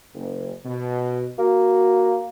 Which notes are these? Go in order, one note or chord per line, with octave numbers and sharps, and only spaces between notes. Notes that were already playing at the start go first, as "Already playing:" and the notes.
F#1
B2
A#3 F#4